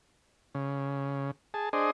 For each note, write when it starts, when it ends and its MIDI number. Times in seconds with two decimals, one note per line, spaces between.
0.55 1.31 49
1.54 1.69 68
1.54 1.69 81
1.73 1.91 62
1.73 1.91 68
1.73 1.91 72
1.73 1.91 75